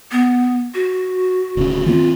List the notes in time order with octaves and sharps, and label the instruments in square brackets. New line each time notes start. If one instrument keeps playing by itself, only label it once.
[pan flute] B3
F#4
[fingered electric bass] D1 C#3
[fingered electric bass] D#3 A#3 C4 [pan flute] F4